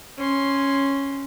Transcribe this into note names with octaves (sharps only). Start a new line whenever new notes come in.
C#4 C6